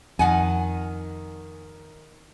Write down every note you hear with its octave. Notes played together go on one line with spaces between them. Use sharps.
F2 D#3 F#5 G#5